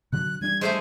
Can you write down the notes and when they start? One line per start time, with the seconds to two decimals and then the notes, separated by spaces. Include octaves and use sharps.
0.12 B2 D3 F#3 F#6
0.41 E3 G3 D4 G#6
0.61 G#3 A3 C5 G#5